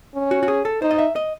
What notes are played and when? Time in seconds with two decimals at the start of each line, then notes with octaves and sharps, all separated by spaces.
0.14 C#4
0.31 F#4
0.43 F#4
0.48 G#4
0.65 A4
0.82 D#4 C5
0.91 D#5
0.98 E5
1.16 D#5